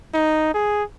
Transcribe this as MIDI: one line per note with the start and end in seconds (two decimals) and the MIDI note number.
0.14 0.51 63
0.54 0.83 68